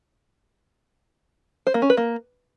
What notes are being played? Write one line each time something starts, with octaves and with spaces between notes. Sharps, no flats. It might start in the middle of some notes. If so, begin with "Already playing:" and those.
C5
A#3
C#4
B4
A#3